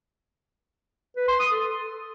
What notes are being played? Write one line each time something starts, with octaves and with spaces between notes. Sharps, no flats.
B4
C6
D#6
A4